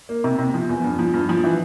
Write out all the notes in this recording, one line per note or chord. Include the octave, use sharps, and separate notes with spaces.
A#3
C3
C3
F3
E2
G2
F3
G2
F3
E3